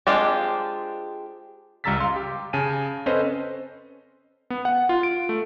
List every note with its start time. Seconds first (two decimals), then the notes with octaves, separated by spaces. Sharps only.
0.07 G#3 C4 D4 F4 G4
1.84 C#2 G3 A#5 E6 A6 B6
2.00 F5 C6
2.16 G4
2.53 C#3 G#5 A5 D#7
3.06 C4 C#4 A4 B4 C5 D#5
4.50 B3
4.65 F#5
4.89 F4
5.03 D7
5.29 A3